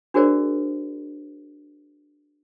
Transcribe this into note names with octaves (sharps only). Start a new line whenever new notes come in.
D4 F#4 G#4 A#4 C5 D5